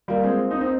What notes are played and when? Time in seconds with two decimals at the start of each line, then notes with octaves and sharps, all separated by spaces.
0.08 G3 A#3 F4 A#4 F5
0.24 G#3 C4
0.51 C4 D#4
0.61 C4 D#4